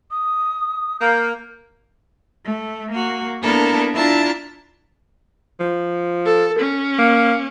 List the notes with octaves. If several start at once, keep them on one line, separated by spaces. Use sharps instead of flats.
D#6
A#3 G6
A3
A#3 F#4
A#3 B3 D4 E4 A4 A#4
D4 E4 F4 E5 A5 A#5
F3
A4
C#4
A#3